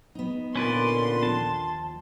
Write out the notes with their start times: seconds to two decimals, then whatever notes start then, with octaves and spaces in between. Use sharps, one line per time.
0.15 B3 D#4
0.56 A#2 D3 C#4 B4 D5 C6
1.23 D#2 F3 A5